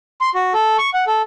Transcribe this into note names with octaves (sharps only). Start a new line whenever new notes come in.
C6
F#4
A4
C#6
F#5
A4